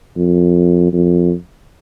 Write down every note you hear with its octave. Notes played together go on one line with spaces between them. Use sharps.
F2
F2